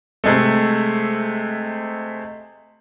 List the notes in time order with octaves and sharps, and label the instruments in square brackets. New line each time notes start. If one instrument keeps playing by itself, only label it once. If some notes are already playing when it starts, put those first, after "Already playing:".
[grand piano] C3 G#3 A3